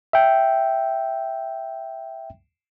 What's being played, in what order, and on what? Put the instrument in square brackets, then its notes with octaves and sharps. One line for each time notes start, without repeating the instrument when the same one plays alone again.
[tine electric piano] E5 G5